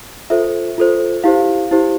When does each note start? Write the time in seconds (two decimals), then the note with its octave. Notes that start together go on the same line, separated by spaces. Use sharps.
0.30 F4 A4 C5 E5
0.78 F4 A4 C5
1.24 E4 G4 C5 F5
1.71 E4 G4 C5